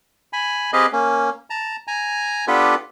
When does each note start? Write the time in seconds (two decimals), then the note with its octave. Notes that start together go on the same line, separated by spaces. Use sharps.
0.33 G#5 B5
0.73 C4 G4 G#4 B4 D#5 F5
0.93 A#3 C#4
1.50 A5 A#5
1.87 G#5 A#5
2.48 B3 D4 F4 G4 A4 B4